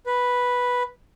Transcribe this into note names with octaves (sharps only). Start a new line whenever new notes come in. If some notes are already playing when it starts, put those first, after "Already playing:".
B4